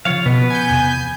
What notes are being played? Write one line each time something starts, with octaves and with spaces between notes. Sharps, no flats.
C#3 F3 F4 C#5 F5
B2 B3 B4
G#5 G6
E2 C3